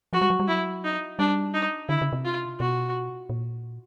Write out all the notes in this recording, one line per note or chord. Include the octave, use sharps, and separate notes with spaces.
F3 F#4
G3
F#3
G3
F#3 E4
D#4
G3 D4
D#4
D3 E4
C#3
C3
F4
B2 F#4
A#2